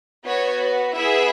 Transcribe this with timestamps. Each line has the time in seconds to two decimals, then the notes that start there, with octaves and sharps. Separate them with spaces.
0.25 B3 F#4 C#5
0.95 B3 E4 G#4 E5